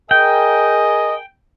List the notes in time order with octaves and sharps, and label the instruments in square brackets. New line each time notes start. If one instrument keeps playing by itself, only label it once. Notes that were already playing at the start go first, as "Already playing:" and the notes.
[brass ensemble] G#4 A#4 G#5 [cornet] D#5 [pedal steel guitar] G5